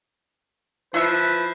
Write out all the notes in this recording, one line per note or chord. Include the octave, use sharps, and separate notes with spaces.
F3 E4 B4 E5